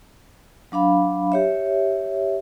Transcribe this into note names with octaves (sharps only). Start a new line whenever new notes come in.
F#3 D4 F5 B5
G4 C#5 E5